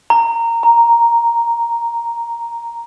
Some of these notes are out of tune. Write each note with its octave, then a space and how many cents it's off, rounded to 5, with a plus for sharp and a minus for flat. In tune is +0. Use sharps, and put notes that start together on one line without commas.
A#5 -15
A#5 +0